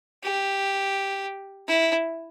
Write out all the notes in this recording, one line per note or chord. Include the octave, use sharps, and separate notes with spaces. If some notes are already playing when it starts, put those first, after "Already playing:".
G4
E4